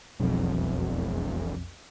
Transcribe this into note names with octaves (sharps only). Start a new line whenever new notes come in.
E1 B1 F2